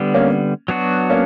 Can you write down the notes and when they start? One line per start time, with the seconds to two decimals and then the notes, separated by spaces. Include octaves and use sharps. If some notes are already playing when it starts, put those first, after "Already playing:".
Already playing: D3 G3 B3
0.14 A#3 C#4
0.68 F#3 B3 D4 F#4
1.10 A#3 C#4